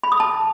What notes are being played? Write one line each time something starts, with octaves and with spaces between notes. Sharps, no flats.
B5
D#6
A5